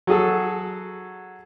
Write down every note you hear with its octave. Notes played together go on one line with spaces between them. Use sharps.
F#3 F#4 G#4 A4